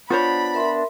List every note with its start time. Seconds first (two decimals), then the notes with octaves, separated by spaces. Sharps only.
0.10 B3 D4 F4 C5 C#5 B5
0.54 A#4 E5 C6